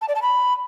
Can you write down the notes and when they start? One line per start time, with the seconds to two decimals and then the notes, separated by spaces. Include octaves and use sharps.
0.02 A5
0.08 D5
0.15 A5
0.22 B5